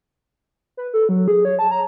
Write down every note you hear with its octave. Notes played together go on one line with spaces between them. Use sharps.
B4
A4
F#3
G#4
C#5
A5
A#5